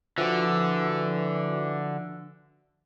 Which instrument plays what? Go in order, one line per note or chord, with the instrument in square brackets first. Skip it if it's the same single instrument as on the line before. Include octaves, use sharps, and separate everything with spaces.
[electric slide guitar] D3 [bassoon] E3 [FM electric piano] F3 F#4